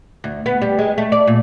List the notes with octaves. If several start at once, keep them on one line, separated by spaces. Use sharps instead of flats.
D2
B3
G3
G#3
A3
D5
A#2